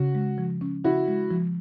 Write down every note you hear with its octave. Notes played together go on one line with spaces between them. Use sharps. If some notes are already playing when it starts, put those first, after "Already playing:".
Already playing: C#3 C#4 F#4
G#3
F3
C#4
C#3 E4 F#4
G#3
F3